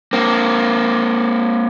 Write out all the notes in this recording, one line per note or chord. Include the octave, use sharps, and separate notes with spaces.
A#3 C4